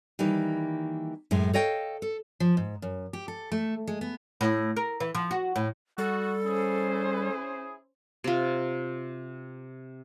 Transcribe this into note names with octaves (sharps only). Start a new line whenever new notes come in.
D#3 E3 G3 A#3
F#2 A2 G#3
A4 C#5 D#5 F5 G5
A4
F3
G#2
F#2
G4
A4
A3
G#3
B3
A2
A#4
E3
F3
F#4
A2
G3 F#4 A4
C#4 E4 G#4 C5
C3 F4